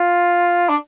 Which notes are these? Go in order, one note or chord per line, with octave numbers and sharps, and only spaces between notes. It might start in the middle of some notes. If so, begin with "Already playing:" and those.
Already playing: F4
D4